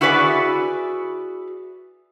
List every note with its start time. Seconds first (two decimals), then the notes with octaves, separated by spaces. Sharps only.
0.01 E4 F#4 G#4 B4 D5 E5